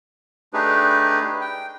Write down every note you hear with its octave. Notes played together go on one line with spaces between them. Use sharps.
A3 D4 D#4 G4 G#4 B4
G5